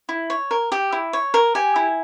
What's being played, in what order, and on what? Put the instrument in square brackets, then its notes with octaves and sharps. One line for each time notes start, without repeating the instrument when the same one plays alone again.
[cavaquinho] E4
C#5
A#4
G4
E4
C#5
A#4
G4 G#5
E4